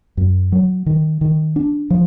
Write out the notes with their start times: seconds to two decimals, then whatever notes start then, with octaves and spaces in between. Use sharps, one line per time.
0.17 F#2
0.52 F#3
0.86 D#3
1.21 D#3
1.56 D4
1.90 F3